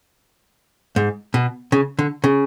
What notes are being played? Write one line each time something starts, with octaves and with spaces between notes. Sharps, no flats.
G#2
B2
C#3
D3
C#3